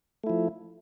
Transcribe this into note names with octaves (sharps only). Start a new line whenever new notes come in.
F3 A3 E4